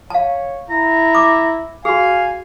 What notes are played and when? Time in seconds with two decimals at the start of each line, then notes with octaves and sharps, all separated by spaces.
0.10 C#5 F5 A5
0.70 E4 A#5
1.15 D6
1.85 F#4 G#4 F5 G#5